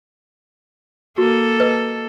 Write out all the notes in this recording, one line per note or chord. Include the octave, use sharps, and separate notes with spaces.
A#3 F#4 A4
B4 D#5